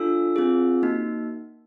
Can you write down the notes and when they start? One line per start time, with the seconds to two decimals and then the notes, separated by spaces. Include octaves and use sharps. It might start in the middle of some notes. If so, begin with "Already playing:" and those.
Already playing: D4 F4 A4 E6
0.36 C4 F4 G#4
0.83 A#3 D#4 F#4